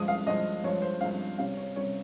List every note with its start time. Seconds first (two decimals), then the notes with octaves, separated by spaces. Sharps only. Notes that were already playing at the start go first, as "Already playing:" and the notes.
Already playing: G2 F3 G#3 D#6
0.08 F5
0.26 G2 F3 G#3 D#5
0.64 G2 F3 G#3 C#5
0.82 C5
1.01 G2 F3 G#3 F5
1.38 C3 G3 C#4 F5
1.57 C#5
1.75 C3 G3 C#4 C#5